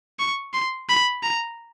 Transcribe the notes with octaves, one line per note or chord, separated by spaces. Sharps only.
C#6
C6
B5
A#5